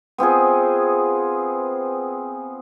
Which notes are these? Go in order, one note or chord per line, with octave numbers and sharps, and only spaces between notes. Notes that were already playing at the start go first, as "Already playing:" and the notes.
B3 C4 F4 G#4